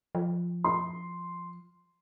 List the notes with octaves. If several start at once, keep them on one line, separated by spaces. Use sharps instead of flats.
F3
C6